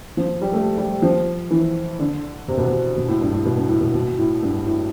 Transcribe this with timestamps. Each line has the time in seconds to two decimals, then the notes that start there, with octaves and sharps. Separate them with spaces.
0.17 F3
0.42 G3
0.53 A3
0.78 G3
1.02 F3
1.50 E3
1.99 D3
2.48 C3
2.58 B2
2.67 C3
2.97 B2
3.08 A2
3.21 G2
3.33 A2
3.46 B2
3.58 G2
3.69 A2
3.81 B2
3.94 B2
4.18 A2
4.43 G2
4.66 A2